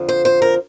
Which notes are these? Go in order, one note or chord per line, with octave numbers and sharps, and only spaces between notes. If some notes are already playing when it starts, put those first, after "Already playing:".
Already playing: F2 D3 F3
C5
C5
A#4